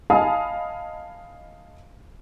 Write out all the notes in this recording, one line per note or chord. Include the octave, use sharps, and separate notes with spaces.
D#5 F5 G#5 A5 B5 D#6